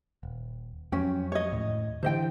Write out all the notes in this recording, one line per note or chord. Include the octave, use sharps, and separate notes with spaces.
D#1
F2 F#3 C#4 C#5 G5
C#5 D#5
D#2 A2
D3 E3 C5 D#5 G5